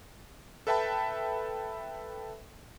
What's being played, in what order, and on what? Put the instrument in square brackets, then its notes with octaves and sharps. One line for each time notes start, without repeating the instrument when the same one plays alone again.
[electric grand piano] A4 B4 E5 G5 A5 B5